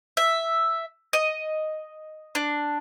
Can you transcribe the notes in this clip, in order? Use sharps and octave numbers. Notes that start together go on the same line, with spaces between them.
E5
D#5
D4